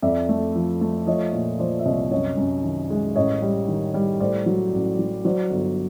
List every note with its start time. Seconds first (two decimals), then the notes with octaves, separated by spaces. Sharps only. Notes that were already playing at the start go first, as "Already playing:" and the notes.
0.02 F2 D5 E5
0.29 A3
0.55 F3
0.81 A3
1.07 F3 C#5 D#5
1.33 A#2
1.59 F3 C5 D5
1.79 E5
1.85 C2 C#5 D#5
2.11 F#2 C#5 D#5
2.37 F#2
2.64 D#3
2.90 G#3
3.16 A1 C#5 D#5
3.42 G3
3.68 D#3
3.94 G3
4.20 A2 C5 D5
4.46 F#3
4.73 A1
4.99 F#3
5.25 F#3 C5 D5
5.51 G1